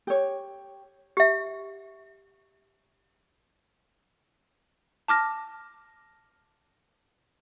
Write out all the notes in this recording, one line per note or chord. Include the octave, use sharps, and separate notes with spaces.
G4 C#5
G4 E5
A5 D6 F6 A#6